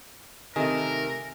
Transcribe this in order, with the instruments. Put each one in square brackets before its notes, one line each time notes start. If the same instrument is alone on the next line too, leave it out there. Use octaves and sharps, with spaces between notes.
[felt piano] C3 [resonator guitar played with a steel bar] D#3 A3 [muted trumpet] A#4 [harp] G#5